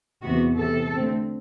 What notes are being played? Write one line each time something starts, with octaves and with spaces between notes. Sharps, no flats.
E2 C3 E3 B3 F#4
C3 E3 B3 A4
D3 A3 C4